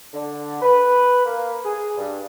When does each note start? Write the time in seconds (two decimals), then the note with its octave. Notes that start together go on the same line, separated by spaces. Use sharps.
0.14 D3
0.62 B4
1.26 A#3
1.65 G#4
1.98 G2